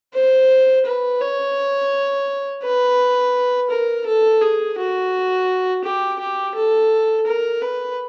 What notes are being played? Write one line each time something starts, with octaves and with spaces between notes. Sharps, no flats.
C5
B4
C#5
B4
A#4
A4
G#4
F#4
G4
G4
A4
A#4
B4